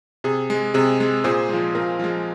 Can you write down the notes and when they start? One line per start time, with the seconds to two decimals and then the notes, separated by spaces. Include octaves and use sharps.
0.24 C3 G#4
0.50 G#3
0.74 C3 G#4
1.00 G#3
1.24 A#2 G#4 C5
1.49 F3 G#3
1.75 A#2 F4 A#4
1.99 F3 G#3